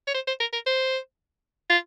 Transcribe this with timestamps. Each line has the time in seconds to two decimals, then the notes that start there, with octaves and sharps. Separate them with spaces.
0.07 C#5
0.14 C5
0.27 C5
0.40 A#4
0.53 A#4
0.66 C5
1.70 F4